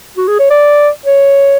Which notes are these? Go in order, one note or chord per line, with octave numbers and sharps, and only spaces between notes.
F#4
G#4
C#5
D5
C#5